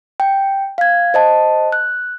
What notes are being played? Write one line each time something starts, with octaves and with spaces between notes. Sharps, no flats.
G5
F5 G#6
C5 D#5 A5
F#6